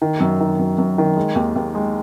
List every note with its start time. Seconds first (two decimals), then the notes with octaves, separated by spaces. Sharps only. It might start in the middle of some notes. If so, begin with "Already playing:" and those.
0.02 D#3
0.20 F#2
0.41 D#3
0.59 F#2
0.78 F#2
0.98 D#3
1.17 G#3
1.36 D#2
1.56 D#2
1.75 G#3